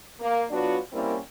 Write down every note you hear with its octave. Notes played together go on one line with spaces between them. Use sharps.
A#3
F#3 B3 D4 F4 F#4
G3 A#3 C4 C#4 E4 A#4